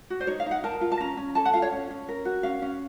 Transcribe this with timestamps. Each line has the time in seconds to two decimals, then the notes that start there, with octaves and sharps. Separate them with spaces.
0.10 F#4
0.21 C5
0.27 D#4 C#5
0.40 F5
0.46 D#4 F#5
0.64 A#4 A5
0.81 F4
0.92 A5
1.00 C#4 A#5
1.17 C#4
1.35 A4 A5
1.45 F#5
1.53 F4 F5
1.62 C#5
1.72 C#4
1.90 C#4
2.08 A#4
2.25 F#4
2.43 C#4 F5
2.62 C#4